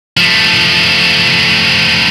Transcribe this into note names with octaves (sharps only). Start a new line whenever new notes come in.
F3 A3